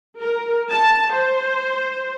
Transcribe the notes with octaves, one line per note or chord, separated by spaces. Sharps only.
A#4
A5
C5